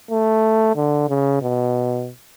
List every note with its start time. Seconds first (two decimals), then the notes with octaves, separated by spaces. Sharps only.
0.11 A3
0.76 D3
1.09 C#3
1.42 B2